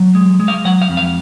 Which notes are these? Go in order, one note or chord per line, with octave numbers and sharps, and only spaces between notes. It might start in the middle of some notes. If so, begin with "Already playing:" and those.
Already playing: F#3
G#3
G#3
F5
F#3 F#5
F5
F2
F5